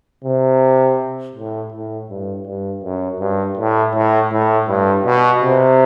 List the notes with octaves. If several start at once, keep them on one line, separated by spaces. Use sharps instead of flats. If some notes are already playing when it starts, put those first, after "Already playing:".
C3
A2
A2
G2
G2
F#2
G2
A2
A2
A2
G2
B2
C3